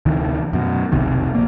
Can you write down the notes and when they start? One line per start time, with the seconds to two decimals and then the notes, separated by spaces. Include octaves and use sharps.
0.06 D2 C3 D#3 E3
0.53 F#2 B2
0.92 F1 B1 C3 D#3
1.33 A#1 A#3